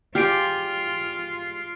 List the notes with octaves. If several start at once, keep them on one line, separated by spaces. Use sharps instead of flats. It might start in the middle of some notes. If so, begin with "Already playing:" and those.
F4 G4 G#4 D5 F6 C7 D7